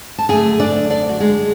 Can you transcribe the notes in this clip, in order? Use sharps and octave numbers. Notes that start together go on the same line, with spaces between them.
A5
F#2 D3 A3 G#4 G#5
D4 D5
D4 D5
F#4
G#3 G#4